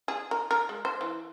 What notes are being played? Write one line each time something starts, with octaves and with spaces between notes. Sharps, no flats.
G#4
A#4
A#4
G#3
C5
E3